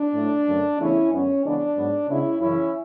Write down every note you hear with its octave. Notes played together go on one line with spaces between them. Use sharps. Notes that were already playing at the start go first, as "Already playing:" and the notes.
Already playing: D4
A2 F#3 A3
F#2 D3 A3
E2 C#3 E3 A3 C#4 E4
F#2 D3 G#3 B3 C#4
E2 C#3 G#3 B3 D4
G#2 F#3 B3
C#3 G#3 B3 C#4 E4
F#2 C#3 E3 C#4 E4